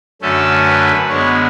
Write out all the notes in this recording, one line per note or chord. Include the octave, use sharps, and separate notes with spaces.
F#2 D3 A3 C#4 A4
B4
F#2 D3 G#3 B3 C#5